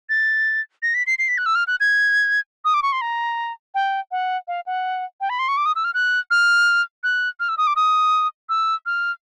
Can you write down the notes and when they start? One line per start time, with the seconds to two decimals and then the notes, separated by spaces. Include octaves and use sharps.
0.09 A6
0.83 A#6
0.94 B6
1.07 C7
1.19 C7
1.28 B6
1.38 F#6
1.46 E6
1.55 F6
1.67 F#6
1.80 G#6
2.65 D#6
2.74 D6
2.83 C#6
2.92 C6
3.01 A#5
3.75 G5
4.11 F#5
4.48 F5
4.66 F#5
5.21 G5
5.30 B5
5.39 C6
5.48 C#6
5.57 D6
5.66 D#6
5.76 E6
5.84 F6
5.94 F#6
6.31 F6
7.04 F#6
7.40 F6
7.49 E6
7.58 D#6
7.67 D6
7.76 D#6
8.49 E6
8.86 F6